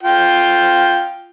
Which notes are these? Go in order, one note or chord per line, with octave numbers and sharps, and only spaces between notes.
F4 G5